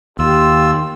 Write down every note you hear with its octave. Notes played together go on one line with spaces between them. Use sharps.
D#2 F4 G4 E6